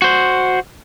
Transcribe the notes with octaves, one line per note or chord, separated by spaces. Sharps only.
F#4 C5